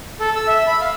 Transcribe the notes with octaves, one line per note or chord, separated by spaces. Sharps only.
A4
E6
E5
B5
F5